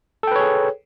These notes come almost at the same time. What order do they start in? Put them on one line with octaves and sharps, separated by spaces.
A4 G5 B4 C#5 G#4